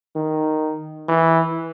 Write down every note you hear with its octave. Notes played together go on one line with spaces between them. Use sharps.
D#3
E3